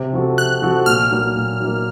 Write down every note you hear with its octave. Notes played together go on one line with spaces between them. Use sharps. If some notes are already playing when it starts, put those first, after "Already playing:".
Already playing: C3
F3 C4 F#4 A4
C3 F#6
F3 C4 F#4 A4
A#2 F6
F#3 A#3
A#2
F#3 A#3